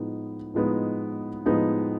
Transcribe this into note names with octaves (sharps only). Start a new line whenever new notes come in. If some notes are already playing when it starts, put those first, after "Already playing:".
Already playing: A2 F3 G#3 B3 D#4
A2 F3 G#3 B3 D#4
A2 F3 G#3 B3 D#4